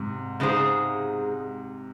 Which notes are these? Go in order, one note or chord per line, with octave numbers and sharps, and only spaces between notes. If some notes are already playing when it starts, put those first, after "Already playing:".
Already playing: G#2 C3
C#3 G#3 D#4 G#4 C5